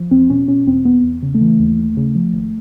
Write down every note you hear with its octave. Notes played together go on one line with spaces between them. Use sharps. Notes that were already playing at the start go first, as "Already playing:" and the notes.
Already playing: F3
E2 C4
B2 C#4
B2 C#4
E2 C4
E2 B3
E2
C#3
A3
E3
D#2
D#2
C#3
F3
G#1